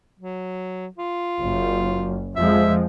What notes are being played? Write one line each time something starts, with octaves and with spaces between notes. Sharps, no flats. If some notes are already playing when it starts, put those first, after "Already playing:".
F#3
F4
F#1 F#2
F2 F3 G#3 E5